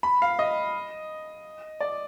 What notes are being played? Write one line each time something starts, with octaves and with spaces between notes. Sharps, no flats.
B5
F5
D#5
D5